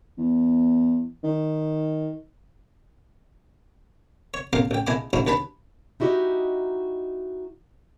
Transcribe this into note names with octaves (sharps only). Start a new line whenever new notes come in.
E2
D#3
C#5
A1 E2 A#4 F5 D6
A1 G5
A#1 E4 D#5 G#5 D6
A1 F3 F#3 D#4 E4 F#4
D#2 D4 B4 A5 B5
D#4 E4 F#4 G4 D#5